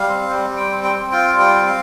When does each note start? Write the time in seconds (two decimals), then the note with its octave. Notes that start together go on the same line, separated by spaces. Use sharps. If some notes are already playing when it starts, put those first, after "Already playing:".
Already playing: G3 F5
0.08 C4
0.30 G3
0.50 G3
0.57 G5
0.71 C4
0.84 G5
0.91 C4
1.12 F4 G5
1.33 G3
1.40 G5
1.53 C4
1.67 F5